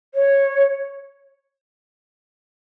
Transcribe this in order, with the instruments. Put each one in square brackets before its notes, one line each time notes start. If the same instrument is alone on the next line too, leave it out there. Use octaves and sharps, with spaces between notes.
[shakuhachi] C#5